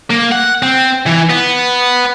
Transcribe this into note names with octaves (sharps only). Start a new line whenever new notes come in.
A#3
F#5
C4
E3
B3